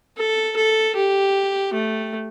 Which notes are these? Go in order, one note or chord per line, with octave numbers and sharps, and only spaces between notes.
A4
A4
G4
A3